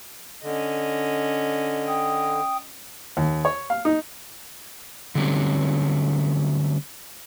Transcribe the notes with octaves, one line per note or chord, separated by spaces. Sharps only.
D3 C#4 D#5
G5 D#6
D#2
C#5
F5
D#4
D3 F#3 G3 A3 C4 C#4